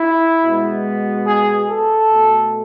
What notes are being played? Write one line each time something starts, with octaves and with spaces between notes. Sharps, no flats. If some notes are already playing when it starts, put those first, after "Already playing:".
Already playing: E4
B2 G#3 B3
G#4
A4
B2 A3